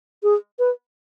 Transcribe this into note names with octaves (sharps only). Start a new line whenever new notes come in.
G#4
B4